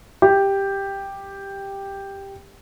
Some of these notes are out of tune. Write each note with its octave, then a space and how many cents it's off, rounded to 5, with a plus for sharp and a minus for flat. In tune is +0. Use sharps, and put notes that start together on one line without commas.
G4 +5